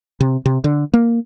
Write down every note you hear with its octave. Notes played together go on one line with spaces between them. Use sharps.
C3
C3
D3
A#3